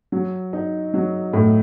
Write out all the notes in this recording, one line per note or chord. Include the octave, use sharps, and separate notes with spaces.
F#3
D#4
F#3
A2